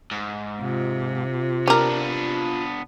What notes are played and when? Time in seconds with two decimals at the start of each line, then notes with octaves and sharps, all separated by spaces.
0.11 G#2
0.61 C3 F4
1.67 B3 D4 G4 A#4